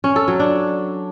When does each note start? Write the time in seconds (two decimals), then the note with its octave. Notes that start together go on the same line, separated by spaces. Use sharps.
0.04 C#4
0.16 A4
0.28 F#3
0.40 D4